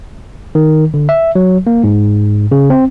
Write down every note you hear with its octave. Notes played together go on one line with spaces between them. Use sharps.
D#3
D3
E5
F#3
A#3
G#2
C#3
C4